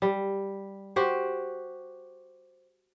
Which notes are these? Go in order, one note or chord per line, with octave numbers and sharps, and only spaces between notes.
G3
F#4 G4 C5